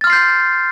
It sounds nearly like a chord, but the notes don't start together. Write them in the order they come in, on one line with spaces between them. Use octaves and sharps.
A6 F6 C6 C7 G6